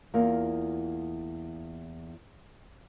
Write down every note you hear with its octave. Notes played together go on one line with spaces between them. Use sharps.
E2 A#3 F4